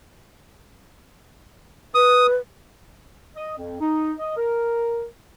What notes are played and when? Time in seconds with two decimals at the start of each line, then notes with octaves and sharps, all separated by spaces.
1.95 B4 D#6
3.36 D#5
3.57 F2
3.81 D#4
4.19 D#5
4.37 A#4